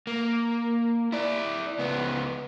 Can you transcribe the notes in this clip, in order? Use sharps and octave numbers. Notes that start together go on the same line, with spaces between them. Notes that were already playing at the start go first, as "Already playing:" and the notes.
A#3
E4 D5
C#2 B3